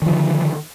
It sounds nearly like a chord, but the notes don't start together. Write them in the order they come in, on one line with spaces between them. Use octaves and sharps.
D#3 F3 D3